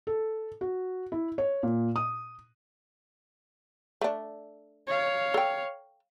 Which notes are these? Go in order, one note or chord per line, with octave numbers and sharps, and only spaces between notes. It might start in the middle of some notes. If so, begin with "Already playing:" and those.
A4
F#4
E4
C#5
A#2
D#6
A3 D4
C#5 F5
A4 G5